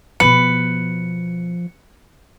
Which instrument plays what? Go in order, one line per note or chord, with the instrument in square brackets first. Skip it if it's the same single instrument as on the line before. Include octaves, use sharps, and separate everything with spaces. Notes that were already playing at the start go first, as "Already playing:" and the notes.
[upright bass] B2 B3 [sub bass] F3 [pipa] B4 [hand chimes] C#7